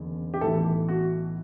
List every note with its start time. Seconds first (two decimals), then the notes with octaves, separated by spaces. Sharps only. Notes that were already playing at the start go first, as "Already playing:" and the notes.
Already playing: F#1 E2 D3
0.34 G4
0.41 B1 A2 E3 A4
0.89 F#4